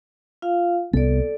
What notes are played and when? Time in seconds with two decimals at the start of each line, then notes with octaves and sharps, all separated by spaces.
0.42 F4 F5
0.94 C2 B3 A4 D5